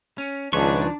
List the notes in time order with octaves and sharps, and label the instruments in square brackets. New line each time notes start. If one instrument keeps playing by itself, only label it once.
[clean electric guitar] C#4
[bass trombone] C#2 [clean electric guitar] D#3 F3 [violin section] D4 [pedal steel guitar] G#4 B4 C#6